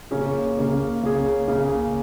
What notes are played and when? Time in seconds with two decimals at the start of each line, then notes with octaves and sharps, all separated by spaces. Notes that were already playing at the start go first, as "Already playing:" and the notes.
0.11 C#3 A#3 C#4 G#4
0.57 C#3 A#3 C#4 G#4
1.03 C#3 A#3 C#4 G#4
1.48 C#3 A#3 C#4 G#4